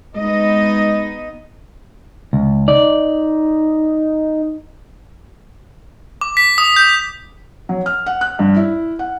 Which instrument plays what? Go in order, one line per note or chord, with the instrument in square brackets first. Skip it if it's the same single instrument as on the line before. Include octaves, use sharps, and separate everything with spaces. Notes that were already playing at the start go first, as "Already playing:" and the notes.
[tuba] G#3 [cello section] B3 D#4 D#5
[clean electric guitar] C#2
[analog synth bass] D#4 [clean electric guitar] D5
[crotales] D6
B6
D#6
G6
[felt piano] F#3
F6
F#5
F#6
G2
E4
F#5